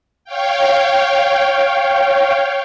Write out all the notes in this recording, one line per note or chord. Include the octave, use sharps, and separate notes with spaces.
C#5 F5 G5